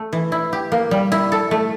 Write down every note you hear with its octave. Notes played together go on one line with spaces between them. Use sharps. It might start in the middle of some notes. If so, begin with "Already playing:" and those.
Already playing: A3
E3
E4
G4
A#3
G3
E4
A4
A3